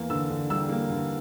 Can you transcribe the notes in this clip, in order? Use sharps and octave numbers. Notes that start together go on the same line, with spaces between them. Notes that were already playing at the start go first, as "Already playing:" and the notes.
Already playing: E2 A#3
D3 E6
D3
G3 E6
A#3
D3